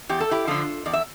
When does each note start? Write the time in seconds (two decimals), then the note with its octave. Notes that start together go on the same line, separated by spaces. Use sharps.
0.09 E2 G4
0.20 A4
0.31 E4 G4
0.47 D3 F3 F4 A4
0.86 E2 D5
0.93 E5